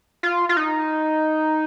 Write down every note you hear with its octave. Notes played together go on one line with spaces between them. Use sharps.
F4
F4
D#4